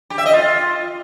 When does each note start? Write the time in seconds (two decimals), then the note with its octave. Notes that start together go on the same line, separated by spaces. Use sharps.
0.10 G4
0.18 E5
0.26 D#5
0.33 F4